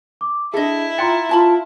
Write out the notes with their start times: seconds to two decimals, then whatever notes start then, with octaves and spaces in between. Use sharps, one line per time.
0.21 D6
0.54 D4 E4 G#4 A4 D#5
0.98 F4 D5 F#5 G5 A#5 C6 A6
1.29 F4 F#4 A5 B5